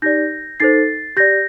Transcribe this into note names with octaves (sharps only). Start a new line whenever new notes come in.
D#4 G4 D5 G6 A#6
D#4 A4 C5 A6 C7
G4 D5 G6 A#6